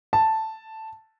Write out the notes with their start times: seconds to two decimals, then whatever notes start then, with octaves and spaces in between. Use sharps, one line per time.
0.13 A5